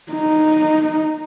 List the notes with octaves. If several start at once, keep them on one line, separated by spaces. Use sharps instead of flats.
D#4